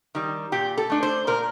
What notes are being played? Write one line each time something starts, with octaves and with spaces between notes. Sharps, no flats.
D#3 G3
A#2 G4
A4
A3 D4
C5
A#2 A#4